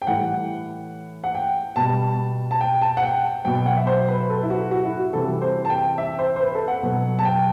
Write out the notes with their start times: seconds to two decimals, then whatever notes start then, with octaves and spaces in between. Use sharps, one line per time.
0.02 G5
0.07 A2 E3 G3 F#5
1.24 F#5
1.35 G5
1.76 B2 G3 A5
2.51 A5
2.61 G5
2.82 A5
2.97 F#5
3.03 G5
3.45 B2 F#3 G5
3.55 G5
3.66 F#5
3.77 E5
3.87 C5
4.08 B4
4.30 A4
4.43 E4
4.50 F#4
4.71 F#4
4.85 E4
5.00 F#4
5.13 C3 E3 G3 A4
5.42 C5
5.65 A5
5.70 G5
5.98 E5
6.19 C5
6.36 C5
6.40 B4
6.55 A4
6.68 F#5
6.83 B2 F#3
7.19 A5
7.25 G5